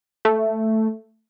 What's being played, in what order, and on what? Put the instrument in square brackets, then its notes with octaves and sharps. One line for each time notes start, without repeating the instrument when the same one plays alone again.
[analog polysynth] A3